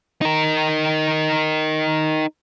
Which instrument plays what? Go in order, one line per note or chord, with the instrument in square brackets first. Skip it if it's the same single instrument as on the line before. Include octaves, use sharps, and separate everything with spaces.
[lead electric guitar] D#4 A#4